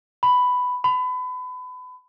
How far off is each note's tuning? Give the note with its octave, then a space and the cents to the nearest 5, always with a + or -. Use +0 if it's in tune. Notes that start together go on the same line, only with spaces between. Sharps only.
B5 +10
B5 +30